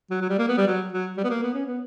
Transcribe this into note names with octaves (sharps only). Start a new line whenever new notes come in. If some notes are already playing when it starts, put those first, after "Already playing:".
F#3
F#3
G3
A#3
B3
G3
F#3
F#3
G3
B3
A#3
B3
C#4
B3